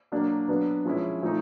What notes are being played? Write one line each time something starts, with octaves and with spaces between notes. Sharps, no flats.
F#3 A#3 D4
F#3 B3 D4
F3 G#3 C#4 E4
F3 A3 C4 D#4